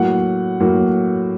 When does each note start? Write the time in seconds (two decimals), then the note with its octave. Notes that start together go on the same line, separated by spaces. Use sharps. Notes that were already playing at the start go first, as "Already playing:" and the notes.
Already playing: A2 F#3 A#3 F#5
0.60 A2 F#3 A#3